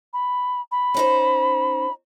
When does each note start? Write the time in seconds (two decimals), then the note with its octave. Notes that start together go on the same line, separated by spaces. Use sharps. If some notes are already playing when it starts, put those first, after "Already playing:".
0.13 B5
0.71 B5
0.94 C#4 D#4 C5